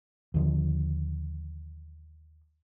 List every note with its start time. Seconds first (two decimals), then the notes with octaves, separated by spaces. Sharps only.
0.34 D#2 D3 F3